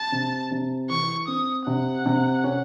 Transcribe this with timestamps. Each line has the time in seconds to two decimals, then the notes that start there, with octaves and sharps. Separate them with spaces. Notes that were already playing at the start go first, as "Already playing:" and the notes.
Already playing: A5
0.12 C3
0.51 C3
0.90 E3 C#6
1.28 C4 D#6
1.67 C3 F#5
2.06 C3
2.44 C#4